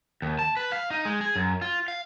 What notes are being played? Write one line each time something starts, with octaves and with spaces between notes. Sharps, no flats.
D#2
A5
B4
F5
D#4
G#3
G#4
F#2
F4
F5